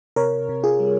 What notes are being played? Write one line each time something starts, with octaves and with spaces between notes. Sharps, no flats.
C3 A#4 C#5
C3
F4 G#4
G3